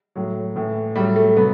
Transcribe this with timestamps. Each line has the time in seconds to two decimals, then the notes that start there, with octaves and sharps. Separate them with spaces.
0.16 A2 F#3
0.56 A2 E3
0.96 A2 F#3 G3
1.16 A3
1.36 C3 F#3 B3